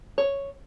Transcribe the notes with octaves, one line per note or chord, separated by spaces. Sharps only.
C#5